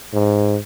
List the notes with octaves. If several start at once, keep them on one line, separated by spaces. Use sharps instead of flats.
G#2